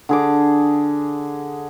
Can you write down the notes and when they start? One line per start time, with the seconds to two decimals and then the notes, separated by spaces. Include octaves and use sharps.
0.09 D3 G#4 D6